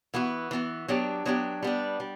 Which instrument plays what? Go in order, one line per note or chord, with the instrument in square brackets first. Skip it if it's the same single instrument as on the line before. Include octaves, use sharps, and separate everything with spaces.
[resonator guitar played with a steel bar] E3 B3 F#4
E3 B3 F#4
F#3 B3 D4 G4
F#3 B3 D4 G4
G3 B3 D4
G3